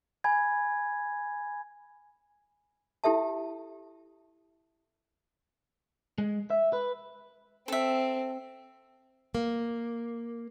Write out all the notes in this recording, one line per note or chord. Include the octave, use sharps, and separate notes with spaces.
G#5 B5 G#6
E4 G4 A4 E5 A5
G#3
E5
B4
C4 A4 E5
A#3